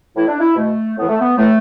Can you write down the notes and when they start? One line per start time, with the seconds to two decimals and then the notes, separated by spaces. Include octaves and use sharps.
0.16 A2 E3 E4
0.28 D4
0.40 E4
0.56 B2 A3
0.97 A2 E3 B3
1.09 A3
1.21 B3
1.37 A2 E3 A3